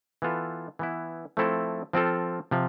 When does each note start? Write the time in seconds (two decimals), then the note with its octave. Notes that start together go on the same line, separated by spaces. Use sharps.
0.22 E3 B3 F4 A4
0.79 E3 B3 E4
1.37 F3 A3 C4 E4 A4
1.93 F3 C4 F4 A4
2.51 C3 F3